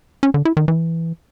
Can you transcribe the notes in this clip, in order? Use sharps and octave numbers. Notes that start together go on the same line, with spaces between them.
C#4
D3
E4
D#3
E3